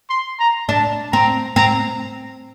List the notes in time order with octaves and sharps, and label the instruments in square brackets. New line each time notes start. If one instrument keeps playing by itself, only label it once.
[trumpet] C6
A#5
[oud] D4 [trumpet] A5
[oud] C4 [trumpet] A#5
[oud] C4 [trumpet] A#5